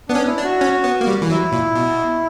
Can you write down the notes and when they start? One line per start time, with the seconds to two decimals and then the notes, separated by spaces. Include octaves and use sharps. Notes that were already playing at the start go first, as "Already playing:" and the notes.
0.09 B3 D4
0.15 C#4
0.27 E4
0.38 D4
0.44 F#4
0.61 C#4
0.84 B3
1.01 A#3
1.07 G3
1.22 E3
1.30 F#3 E4
1.52 A#2
1.75 B2